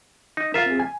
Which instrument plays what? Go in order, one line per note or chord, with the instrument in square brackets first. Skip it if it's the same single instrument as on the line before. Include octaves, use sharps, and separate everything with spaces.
[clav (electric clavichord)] D#4
[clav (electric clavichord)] F4 E5 [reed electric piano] A#4 F5
[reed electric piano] C4 G#4
G#5